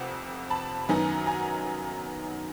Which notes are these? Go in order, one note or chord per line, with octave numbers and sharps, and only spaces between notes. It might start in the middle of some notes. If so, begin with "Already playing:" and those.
Already playing: F1 F2 C3 F#5
A5 B5
F#2 D#3 F#3 B3 D#4 G#5 A#5
G#5 A#5